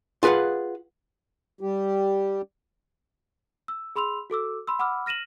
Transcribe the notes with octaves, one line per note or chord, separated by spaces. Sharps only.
F4 G#4 B4 F5 F#5
G3 G4
E6
G#4 B5 C6 E6 F7
F#4 A4 D6 E6
B5 C6 E6
F#5 B5 D6 E6 F6
F6 A#6 D#7 E7 F#7